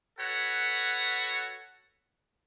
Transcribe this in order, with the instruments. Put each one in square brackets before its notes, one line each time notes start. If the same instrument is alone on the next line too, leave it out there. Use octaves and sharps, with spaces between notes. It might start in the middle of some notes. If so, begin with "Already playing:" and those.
[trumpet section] F#4 A4 B4 C#5 F#5